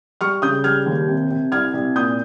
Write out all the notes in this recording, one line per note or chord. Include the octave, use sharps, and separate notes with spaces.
G3 C#6 F6
C#3 D#6 G6
G3 F6 G#6
D#2
C3
C3
C2 F6 G#6
C2
A#2 D#6 G6